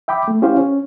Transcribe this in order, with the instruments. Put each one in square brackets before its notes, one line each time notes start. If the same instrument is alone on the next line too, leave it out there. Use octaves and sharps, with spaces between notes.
[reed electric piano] E5 G5 B5 D6
A3
C#4 E4 G4 A#4 C5 F5
C#4